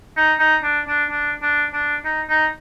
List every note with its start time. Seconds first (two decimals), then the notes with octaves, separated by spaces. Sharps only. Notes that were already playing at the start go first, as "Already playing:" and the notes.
0.17 D#4
0.39 D#4
0.63 D4
0.88 D4
1.11 D4
1.42 D4
1.73 D4
2.05 D#4
2.29 D#4